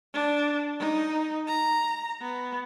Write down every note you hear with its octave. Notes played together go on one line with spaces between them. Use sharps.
D4
D#4
A#5
B3